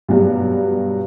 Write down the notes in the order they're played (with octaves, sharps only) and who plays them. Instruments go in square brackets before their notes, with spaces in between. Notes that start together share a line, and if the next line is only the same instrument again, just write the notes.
[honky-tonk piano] G2 B2 F#3 G3